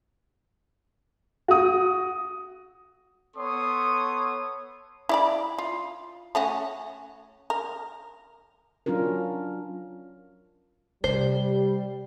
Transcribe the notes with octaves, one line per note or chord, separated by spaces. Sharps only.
F#4 D#6
B3 A4 C#5 C6 C#6 D#6
E4 D5 B5
F4
A3 C#4 F#4
A#4
F#3 C#4 D4 F4 A#4
C3 G3 C5